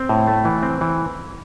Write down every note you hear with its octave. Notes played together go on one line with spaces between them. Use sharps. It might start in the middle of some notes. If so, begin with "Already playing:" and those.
Already playing: C4
A2
A3
E3
C4
E3